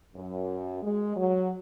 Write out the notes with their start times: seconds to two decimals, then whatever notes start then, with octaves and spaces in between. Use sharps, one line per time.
0.16 F#2
0.83 G#3
1.16 F#3